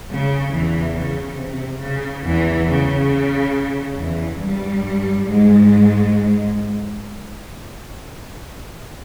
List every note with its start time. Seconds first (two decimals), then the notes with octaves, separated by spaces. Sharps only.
0.12 C#3
0.54 E2 E3
0.99 C#3
1.42 C3
1.84 C#3
2.27 E2 E3
2.70 C#3
3.99 E2 E3
4.42 G2 G3
5.29 G#2 G#3